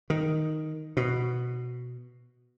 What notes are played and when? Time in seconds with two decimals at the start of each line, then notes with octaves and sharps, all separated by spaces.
0.10 D#3
0.97 B2